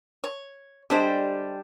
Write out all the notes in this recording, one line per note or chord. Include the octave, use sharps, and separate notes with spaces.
C#5
D3 G3 G#3 D4 G4 C5